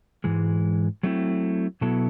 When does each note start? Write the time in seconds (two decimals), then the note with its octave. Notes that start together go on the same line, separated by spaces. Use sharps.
0.24 G#2 E3 G#3
1.03 F#3 A3 C4 E4
1.81 B2 F#3 B3 E4 A4